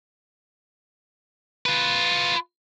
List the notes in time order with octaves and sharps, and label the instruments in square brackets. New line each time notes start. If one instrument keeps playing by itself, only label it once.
[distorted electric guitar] F4 B4